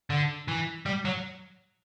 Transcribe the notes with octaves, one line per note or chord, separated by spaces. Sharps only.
D3
E3
G3
F#3